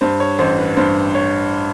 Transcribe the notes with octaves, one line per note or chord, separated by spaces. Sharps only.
G2 C5
C#5
A1 C5
B4
G2 C5
C#5